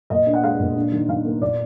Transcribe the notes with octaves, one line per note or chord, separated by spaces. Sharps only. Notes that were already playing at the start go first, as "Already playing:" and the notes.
A#2 D#5
D4
F#5
G#3 F5
A#2
D4
D#3
D#3 F5
A#3
A#2 D5